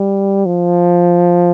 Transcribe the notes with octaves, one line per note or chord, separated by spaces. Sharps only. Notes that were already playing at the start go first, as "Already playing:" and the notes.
Already playing: G3
F3